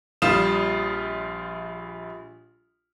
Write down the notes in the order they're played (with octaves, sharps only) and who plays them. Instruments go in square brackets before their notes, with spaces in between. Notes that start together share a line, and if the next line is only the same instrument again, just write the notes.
[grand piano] A#1 G3 F4 D#6 E7